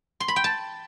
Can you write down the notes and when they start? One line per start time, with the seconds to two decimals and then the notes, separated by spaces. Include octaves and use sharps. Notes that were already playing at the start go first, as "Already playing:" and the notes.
0.20 C6
0.28 B5
0.36 G5
0.44 A5